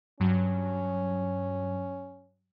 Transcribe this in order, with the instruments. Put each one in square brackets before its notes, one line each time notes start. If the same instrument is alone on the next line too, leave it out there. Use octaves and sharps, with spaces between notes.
[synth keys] G2 F#3 [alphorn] C#4